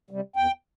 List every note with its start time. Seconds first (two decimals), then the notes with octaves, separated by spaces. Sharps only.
0.10 C3 G3
0.36 E2 G5